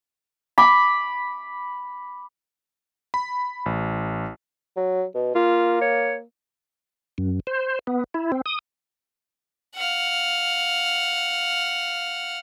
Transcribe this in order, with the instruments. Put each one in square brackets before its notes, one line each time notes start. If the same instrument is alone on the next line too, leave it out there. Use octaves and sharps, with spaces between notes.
[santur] B5 D6
[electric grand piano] B5
A1
[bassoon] F#3
B2
[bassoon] A#3 [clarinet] F4
[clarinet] C#5
[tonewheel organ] F#2
C5
B3
E4
C4
D#6
[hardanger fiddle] F5 F#5